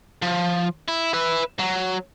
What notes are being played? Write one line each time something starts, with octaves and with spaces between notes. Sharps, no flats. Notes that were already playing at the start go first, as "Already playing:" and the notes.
F3
E4
B4 E5
F#3